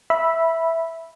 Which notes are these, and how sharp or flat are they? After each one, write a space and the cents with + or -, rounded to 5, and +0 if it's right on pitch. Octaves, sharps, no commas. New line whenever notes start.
E5 +0 B5 -10